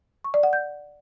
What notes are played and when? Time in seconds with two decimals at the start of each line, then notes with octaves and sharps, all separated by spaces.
0.24 C#6
0.34 D5
0.43 F#5
0.53 G6